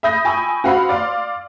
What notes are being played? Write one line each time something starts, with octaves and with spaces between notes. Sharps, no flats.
E5 B5 D#6 G6 A#6
G5 G#5 B5 C#6 E6
F#4 C5 F5 F#5 B5 E6
D5 F5 C6